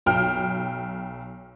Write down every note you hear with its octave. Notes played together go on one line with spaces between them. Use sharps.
B1 G5 F6